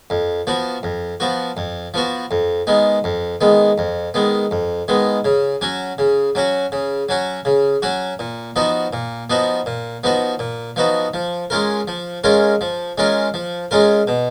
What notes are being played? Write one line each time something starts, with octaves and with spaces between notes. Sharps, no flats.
F2
F3 B3 F#4
F2
F3 B3 F#4
F2
F3 B3 F#4
F2
D#3 G#3 B3
F2
D#3 G#3 B3
F2
D#3 G#3 B3
F2
D#3 G#3 B3
C#3
F#3 C#4 F#4
C#3
F#3 C#4 F#4
C#3
F#3 C#4 F#4
C#3
F#3 C#4 F#4
A#2
F3 B3 D#4 F#4
A#2
F3 B3 D#4 F#4
A#2
F3 B3 D#4 F#4
A#2
F3 B3 D#4 F#4
F3
G#3 C#4 F4 A#4
F3
G#3 C#4 F4 A#4
F3
G#3 C#4 F4 A#4
F3
G#3 C#4 F4 A#4
B2